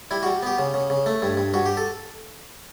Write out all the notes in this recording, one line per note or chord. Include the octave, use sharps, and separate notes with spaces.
G3 E4
G3 F#4
B3 G4
C#3
C#3
C#3
A3
G2
G2
G2 F#4
G4
A4